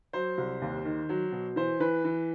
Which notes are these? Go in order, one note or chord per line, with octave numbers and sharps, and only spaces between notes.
F#3 C5
C2
D#2
D#3
F#3
B2
E3 C5
E3 B4
E3